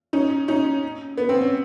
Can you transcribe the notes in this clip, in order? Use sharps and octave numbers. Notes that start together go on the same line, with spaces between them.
C#4 D#4
C#4 D#4
B3
C4
C#4